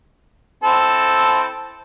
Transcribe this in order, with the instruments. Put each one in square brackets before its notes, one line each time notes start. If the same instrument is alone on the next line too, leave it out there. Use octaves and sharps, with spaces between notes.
[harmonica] C4 E4 A4